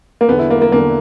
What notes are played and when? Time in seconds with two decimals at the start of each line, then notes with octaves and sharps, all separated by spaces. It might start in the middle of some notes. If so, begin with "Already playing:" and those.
0.21 A#3
0.28 E2 B3
0.32 D3
0.39 E4
0.50 A#3
0.62 A#3
0.72 E2 D3 A#3